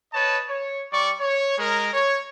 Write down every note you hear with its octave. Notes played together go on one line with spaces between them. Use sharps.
B4 C#5 D#5 A5
C#5
G3 D5 C#6
C#5
G#3 A#4
C#5